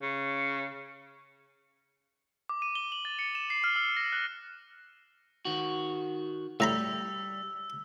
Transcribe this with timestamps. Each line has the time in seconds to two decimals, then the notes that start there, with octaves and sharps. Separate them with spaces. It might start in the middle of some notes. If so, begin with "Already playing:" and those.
0.02 C#3
2.49 D6
2.62 D#7
2.75 G7
2.92 F#7
3.05 A6
3.19 C#7
3.35 E7
3.50 C7
3.64 F6
3.76 E6
3.97 A#6
4.12 F#6
5.45 D#3 F#4
6.60 A2 G3 A#5 B5 E6